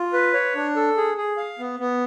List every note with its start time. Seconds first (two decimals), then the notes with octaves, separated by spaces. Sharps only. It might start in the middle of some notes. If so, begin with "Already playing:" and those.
Already playing: F4
0.13 B4
0.33 C#5
0.55 D4
0.76 A4
0.97 G#4
1.17 G#4
1.37 F5
1.59 B3
1.80 B3